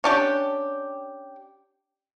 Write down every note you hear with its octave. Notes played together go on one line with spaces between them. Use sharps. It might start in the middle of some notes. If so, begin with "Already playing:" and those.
C#4 D4 G4